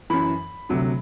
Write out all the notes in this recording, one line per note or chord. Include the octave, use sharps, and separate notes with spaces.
F#2 E3 B5
D2 C3 F#3